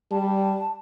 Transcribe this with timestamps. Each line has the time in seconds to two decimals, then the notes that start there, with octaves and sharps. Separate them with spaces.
0.11 G3 A5